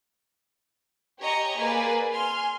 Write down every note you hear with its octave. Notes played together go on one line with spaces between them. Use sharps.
G4 C#5 D#5 G#5 A#5 C#6
A#3 G#4 B4 D5 G#5
G#5 C6 F6